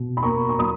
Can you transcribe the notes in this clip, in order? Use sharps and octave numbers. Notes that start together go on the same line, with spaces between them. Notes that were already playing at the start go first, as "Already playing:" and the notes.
Already playing: B2
B5
A#3 A#5 C#6
C#6
F#3 B5 D#6